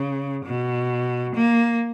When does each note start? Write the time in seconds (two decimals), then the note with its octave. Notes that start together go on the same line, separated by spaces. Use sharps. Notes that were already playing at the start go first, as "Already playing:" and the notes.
Already playing: C#3
0.45 B2
1.35 A#3